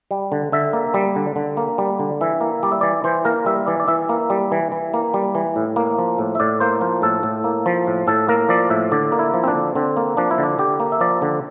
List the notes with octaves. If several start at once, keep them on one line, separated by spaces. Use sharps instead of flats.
G3
D3
D3 E5
A#3
G3
D3
D3
A#3
G3
D3
E3 E5
A#3
G3 D5
E5
E3 D5
E3 C5
A#3 A#4
G3 E5
E3 D5
D5
E3 E5
A#3
G3
E3
E3
A#3
G3
E3
A2
A#3
F3
A2
E5
A2 D5
A#3 C5
F3 F4
A2 A4
A2
A#3
F3
A2
A2 A4
A#3 A#4
F3 D5
A2 E5
D3 D5
A#3
E4
F3
C4
D4
D3
D3 C4
A#3
F3 D4
E4
D3
D4
D3 G4
A#3
E5
F3 D5
D3